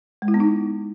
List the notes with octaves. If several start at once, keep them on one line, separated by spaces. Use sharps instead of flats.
G#3
E4
B3
D#4